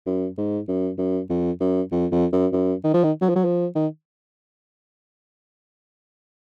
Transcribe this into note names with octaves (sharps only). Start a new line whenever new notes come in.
F#2
G#2
F#2
F#2
F2
F#2
F2
F2
F#2
F#2
D#3
F3
D#3
F#3
F3
F#3
F3
D#3